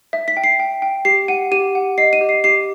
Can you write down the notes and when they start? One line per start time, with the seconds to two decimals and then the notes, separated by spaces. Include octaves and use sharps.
0.13 E5
0.28 B6
0.37 G5
0.44 C7
0.60 G5
0.82 G5
1.05 G4 C7
1.28 F#5 D#7
1.52 G4 D#7
1.75 F#5
1.98 D#5 C7
2.13 D#7
2.21 G4
2.29 C7
2.44 G4 C7